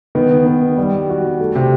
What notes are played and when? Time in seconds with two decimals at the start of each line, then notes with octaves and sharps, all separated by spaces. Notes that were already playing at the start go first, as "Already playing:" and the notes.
0.15 D#3 B3
0.46 B3
0.77 G3
1.09 F#4
1.40 A3
1.55 C3